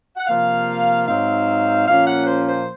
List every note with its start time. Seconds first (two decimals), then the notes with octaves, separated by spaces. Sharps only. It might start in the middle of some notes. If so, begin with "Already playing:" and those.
0.16 F#5
0.27 C3 F3 A#3 F5
1.06 G#2 F#3 C4 D#4 F5
1.85 A#2 F3 A#3 C#4 F5
2.05 F#5
2.25 C5
2.45 C5